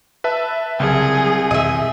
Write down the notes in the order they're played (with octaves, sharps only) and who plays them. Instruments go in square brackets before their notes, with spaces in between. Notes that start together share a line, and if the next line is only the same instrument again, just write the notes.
[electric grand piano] B4 E5 A5
[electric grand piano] C2 G#5 [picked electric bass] C#3 F#3 [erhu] G#4
[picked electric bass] E2 B2 D#3 [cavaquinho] D#5 E5